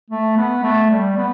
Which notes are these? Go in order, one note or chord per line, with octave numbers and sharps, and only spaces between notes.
A3
B3
A3
G3
B3